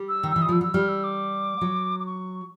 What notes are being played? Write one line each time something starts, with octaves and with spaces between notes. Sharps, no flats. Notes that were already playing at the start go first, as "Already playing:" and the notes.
Already playing: G3
E6
D#3
E3 E6
D#6
F3 E6
F#3 E6
G3 F6
E6
D6
F#3
D6
C#6